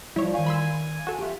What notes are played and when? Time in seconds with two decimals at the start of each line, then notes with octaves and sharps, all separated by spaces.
0.16 F3 G3 E4 C#5
0.34 D#3 F5 G#5
0.46 B5 C6 E6
1.07 F#4 A4
1.19 F4 G4 E5